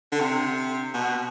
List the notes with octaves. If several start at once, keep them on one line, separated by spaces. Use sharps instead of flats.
D3
C3
B2